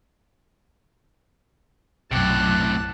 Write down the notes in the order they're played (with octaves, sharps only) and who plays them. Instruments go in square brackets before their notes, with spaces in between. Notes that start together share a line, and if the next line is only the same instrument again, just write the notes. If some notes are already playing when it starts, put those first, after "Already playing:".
[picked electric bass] B1 F#2 [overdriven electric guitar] A2 C3 [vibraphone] F#3 D6 [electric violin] A5 F#6